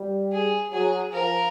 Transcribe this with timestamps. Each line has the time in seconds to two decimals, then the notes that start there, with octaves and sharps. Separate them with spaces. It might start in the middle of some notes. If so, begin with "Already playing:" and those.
Already playing: G3
0.32 G#4
0.72 F#3 G#4
1.13 F3 A#4